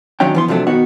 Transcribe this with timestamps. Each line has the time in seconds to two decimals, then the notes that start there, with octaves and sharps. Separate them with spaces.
0.20 B1 D#3 F#3 C#4 D4 G5
0.35 E3 B3 C6
0.48 C3 F3 F#3 A3 D4
0.67 B2 D#3 B3 F#4